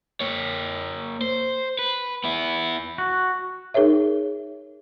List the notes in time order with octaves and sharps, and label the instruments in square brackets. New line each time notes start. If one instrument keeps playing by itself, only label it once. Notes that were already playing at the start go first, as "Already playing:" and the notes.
[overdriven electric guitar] A#3 C#5
C5
B4
B3 E4
[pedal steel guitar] F#4
[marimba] D#4 G#4 A#4 C#5 E5